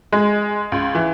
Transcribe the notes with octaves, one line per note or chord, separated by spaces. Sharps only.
G#3
C#2
E3